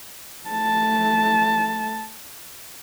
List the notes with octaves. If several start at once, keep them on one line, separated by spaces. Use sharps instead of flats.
A3 A5